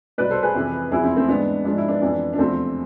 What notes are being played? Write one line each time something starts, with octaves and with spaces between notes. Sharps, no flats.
C2 B2 B4 D5
A4 C5
G#4 B4
F2 C3 E3
E2 C3 F3 E4 G#4
C4 E4
A3 C4
G#2 E3 B3 D4
G#2 F3 D4
E4
B3 D4
F2 E3
D4
E2 C3 F3 A3 C4